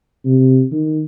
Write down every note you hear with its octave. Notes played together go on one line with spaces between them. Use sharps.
C3
D#3